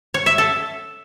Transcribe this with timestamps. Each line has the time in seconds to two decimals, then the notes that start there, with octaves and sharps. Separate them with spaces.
0.14 C#5
0.26 E5
0.38 A4